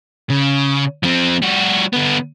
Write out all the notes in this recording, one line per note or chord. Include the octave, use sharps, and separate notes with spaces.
C#3
F3 C4
G3 F#4
D3 B3